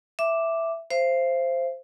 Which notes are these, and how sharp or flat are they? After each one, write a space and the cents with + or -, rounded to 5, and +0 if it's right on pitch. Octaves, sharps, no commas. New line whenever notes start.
E5 +0 D6 +0
C5 +0 F5 -45